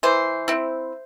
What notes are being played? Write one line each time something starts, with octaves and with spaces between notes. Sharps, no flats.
E3 C5
C4 E4